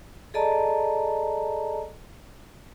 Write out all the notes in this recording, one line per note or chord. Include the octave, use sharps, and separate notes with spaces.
G#4 A4 D5 D#5 A5 A#5